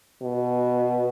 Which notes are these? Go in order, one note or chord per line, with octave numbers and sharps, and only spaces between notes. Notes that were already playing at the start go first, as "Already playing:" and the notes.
B2